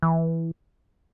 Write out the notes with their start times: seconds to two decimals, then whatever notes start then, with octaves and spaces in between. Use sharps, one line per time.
0.02 E3